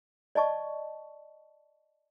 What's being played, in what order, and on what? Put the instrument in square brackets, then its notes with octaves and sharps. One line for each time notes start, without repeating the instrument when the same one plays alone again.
[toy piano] D5 D#5 A5 C#6